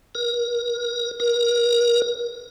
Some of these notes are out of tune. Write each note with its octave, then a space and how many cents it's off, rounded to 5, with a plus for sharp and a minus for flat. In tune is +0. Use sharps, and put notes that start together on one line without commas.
A#4 +35
A#4 +30